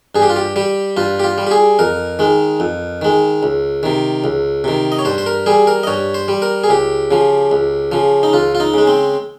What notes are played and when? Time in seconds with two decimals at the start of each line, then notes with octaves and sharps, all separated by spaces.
0.15 G2 G#4
0.22 G4
0.30 F4
0.36 G4
0.56 G3 G4
0.97 G2 F4
1.20 G4
1.24 F4
1.38 G3
1.47 G4
1.51 G#4
1.79 F2 A#4
2.19 D#3 G#3
2.60 F2
3.01 D#3 G#3
3.43 C#2
3.83 C3 D#3
4.24 C#2
4.64 C3 D#3
4.92 D#5
4.99 C#5
5.05 G2 C5
5.18 C5
5.26 A#4
5.46 G3 G#4
5.67 A#4
5.83 D#5
5.87 G2 C#5
6.14 C5
6.28 G3
6.42 A#4
6.64 G#4
6.69 C#2 G4
7.11 C#3 F3
7.51 C#2
7.92 C#3 F3
8.23 D#4
8.33 C#2 F4
8.55 F4
8.60 D#4
8.74 C#3 G#3
8.87 C4